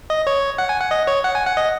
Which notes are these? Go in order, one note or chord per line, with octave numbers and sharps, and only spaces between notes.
D#5
C#5
F#5
G#5
F#5
D#5
C#5
F#5
G#5
F#5
D#5